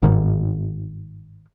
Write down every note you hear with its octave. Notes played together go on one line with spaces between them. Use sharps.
G1 G#2 D#3